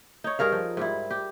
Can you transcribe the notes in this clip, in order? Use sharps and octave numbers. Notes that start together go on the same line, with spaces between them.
D#4 C#5
G2 G#4 A#4 F5
F3
G#2 G3 E4
G4